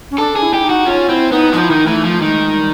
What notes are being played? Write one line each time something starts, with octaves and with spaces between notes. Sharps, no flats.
C#4
D4 A4
G#4
E4
G4
D#4
F#4
C#4 F4
C4 E4
B3 D#4
F3 D#4
E4
D#3 D#4
E3 A3
F3
D#3 G#3
G3